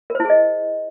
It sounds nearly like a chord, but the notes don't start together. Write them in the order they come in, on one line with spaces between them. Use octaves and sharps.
A#4 C5 E4 G#4 D#5